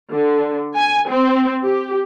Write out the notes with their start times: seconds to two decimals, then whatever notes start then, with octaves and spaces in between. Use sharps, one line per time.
0.12 D3
0.77 G#5
1.11 C4
1.64 G4